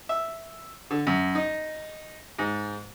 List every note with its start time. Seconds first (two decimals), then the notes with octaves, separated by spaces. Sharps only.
0.09 E5
0.90 D3
1.07 F#2
1.35 D#4
2.39 G#2